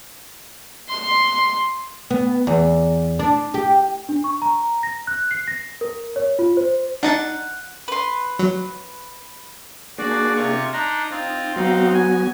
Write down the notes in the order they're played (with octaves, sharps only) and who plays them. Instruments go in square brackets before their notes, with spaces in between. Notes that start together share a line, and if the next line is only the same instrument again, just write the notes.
[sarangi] C6
[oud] B3
E2
D4
G4
[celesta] D4
C#6
A#5
A#6
F#6
C7
A#6
A#4
C#5
F4
C5
[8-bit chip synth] D4 D#4 A6 [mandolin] F#5
[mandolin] B4 C6
[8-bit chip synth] F#3
[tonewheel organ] A#3 D4 G#4 [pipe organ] F#4 D5
[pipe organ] C3 F4 C#6
[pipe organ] D4 D#4 A#5 [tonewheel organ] C6
[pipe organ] C4 F4 [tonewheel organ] D#4
[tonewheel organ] F#3 B3 F#4 [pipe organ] C4 D#4 F5
[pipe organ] G#5